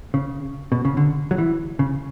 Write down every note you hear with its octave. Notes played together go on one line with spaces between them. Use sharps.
C#3
B2
C#3
D3
F#3
E3
C#3